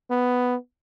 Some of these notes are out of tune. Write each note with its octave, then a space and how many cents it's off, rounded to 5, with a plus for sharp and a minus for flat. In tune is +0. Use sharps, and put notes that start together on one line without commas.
B3 +5